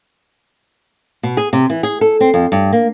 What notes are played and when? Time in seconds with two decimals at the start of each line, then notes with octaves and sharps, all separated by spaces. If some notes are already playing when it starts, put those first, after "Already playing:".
1.23 B2
1.37 G#4
1.53 C3
1.70 E3
1.83 G#4
2.01 A4
2.21 C4
2.34 F2
2.52 G2
2.72 A#3